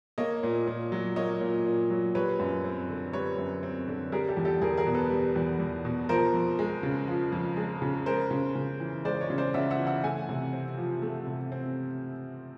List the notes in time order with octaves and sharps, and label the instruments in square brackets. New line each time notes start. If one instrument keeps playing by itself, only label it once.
[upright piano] A#3 C#5 D#5
A#2
A#2
F#3
A#3 C#5 D#5
A#2
A#2
F#3
G3 B4 C#5
F#2
C4
D3
G3 B4 C#5
F#2
C4
D3
G3 G#4 A#4
G4 A4
E2
G4 A4
E2 G#4 A#4
G#4 A#4
B2
A4 B4
G3
E2
E2
B2
F3 A#4 C5
F2
G#3
C#3
F3
F2
G#3
C#3
G#3 A#4 C5
C#3
C#3
E3
G#3 C5 D5
C#5 D#5
C#3
C5 D5
C#3 E5 F#5
E5 F#5
E3
E5 F#5
A3 F#5 G#5
C3
C4
F3
A3
C3
C4